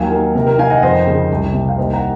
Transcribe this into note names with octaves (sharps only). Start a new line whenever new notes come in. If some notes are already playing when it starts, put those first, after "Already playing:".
Already playing: D#2 F#3 F5 G#5
D#3
C3 A#4
A#4
D#3 F5 G#5
D#5 F#5
F2 C5 D#5
C#3
C2
C3
F5
D#2 C5 D#5
F#5 A#5